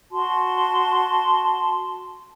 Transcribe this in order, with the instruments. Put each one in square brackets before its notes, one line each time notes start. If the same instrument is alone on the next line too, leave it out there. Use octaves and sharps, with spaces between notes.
[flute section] F#4 A5 C6